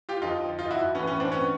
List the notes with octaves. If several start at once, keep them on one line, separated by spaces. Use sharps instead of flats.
F4 G4
F2 D3 F3 D#4 F4
D#4 F4
E4 F#4
A2 E3 B3 C#4
B3 C#4
C4 D4
B3 C#4